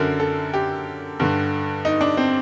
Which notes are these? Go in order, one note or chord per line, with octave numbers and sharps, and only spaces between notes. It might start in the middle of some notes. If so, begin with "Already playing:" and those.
Already playing: F#2 D3 A#4
A4
G4
G2 D3
D#4
D4
C4